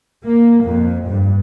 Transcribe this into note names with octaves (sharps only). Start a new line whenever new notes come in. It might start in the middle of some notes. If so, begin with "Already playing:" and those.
A#3
F2
G2